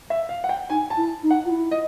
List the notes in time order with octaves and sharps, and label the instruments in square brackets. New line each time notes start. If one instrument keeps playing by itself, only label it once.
[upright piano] E5
F5
F#5
G5
[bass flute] D#4 [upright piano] G#5
[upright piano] A5
[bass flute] E4
D#4
[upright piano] F#5
[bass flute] F4
E4
[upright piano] D#5